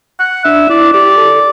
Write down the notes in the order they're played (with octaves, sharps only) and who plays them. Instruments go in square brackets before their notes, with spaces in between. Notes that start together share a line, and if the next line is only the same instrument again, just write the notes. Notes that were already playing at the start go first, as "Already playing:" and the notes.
[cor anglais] F#5
[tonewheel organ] D4 [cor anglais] E5
[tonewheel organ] E4 [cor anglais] D5
[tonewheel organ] G4 [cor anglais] D5
[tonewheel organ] A4